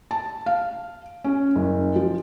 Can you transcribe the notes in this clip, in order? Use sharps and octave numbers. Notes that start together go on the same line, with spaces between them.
A5
F5
C#4
F#1
F3